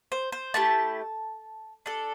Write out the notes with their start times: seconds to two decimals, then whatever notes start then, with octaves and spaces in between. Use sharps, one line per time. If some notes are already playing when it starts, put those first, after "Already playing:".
0.12 C5
0.32 C5
0.54 A3 E4 G4 A5
1.86 D4 A4